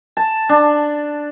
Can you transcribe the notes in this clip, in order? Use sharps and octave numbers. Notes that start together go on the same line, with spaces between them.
A5
D4